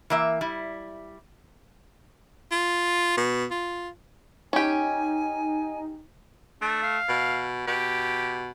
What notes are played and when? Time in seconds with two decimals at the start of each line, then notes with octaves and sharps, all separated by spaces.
0.10 E3 A#3 E5
0.41 G3 E4
2.52 F4
3.17 B2
3.51 F4
4.53 C#4 D#4 G4 G#5
6.61 A3 D4
6.83 F5
7.08 B2
7.67 B2 G4